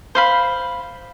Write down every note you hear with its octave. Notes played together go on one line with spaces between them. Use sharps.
C5 F5 B5